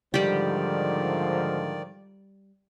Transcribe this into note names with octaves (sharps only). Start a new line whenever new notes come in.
G#2 D3 D#3 F3 G3 G4 D5